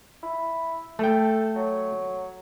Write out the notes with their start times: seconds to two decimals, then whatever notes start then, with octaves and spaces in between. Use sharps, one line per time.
0.23 E4
0.99 A3 A4 G5
1.55 F#3